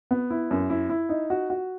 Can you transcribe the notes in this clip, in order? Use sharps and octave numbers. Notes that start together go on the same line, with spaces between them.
B3
E4
F#2
E4
E4
D#4
F#4
F#4